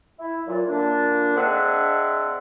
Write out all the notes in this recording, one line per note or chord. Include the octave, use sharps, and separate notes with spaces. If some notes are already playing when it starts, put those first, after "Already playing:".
E4
A#2 E3 F#3 F4
A#2 D3 A#3 D4
C4 D4 G#4 D#5 E5 F#5